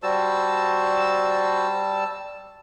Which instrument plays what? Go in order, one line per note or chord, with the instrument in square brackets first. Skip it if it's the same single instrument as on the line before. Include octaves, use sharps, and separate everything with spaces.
[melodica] G3 A5 E6 [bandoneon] F#4 C5